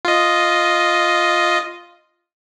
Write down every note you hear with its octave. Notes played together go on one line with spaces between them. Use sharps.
F4 D#5